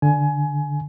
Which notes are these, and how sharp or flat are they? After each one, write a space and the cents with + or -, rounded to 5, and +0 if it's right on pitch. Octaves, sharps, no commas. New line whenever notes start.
D3 +0 G#5 +20